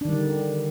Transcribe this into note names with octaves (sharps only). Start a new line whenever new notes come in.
D3 D#3 G3 D4